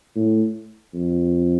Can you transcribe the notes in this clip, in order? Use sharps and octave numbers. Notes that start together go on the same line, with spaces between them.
A2
F2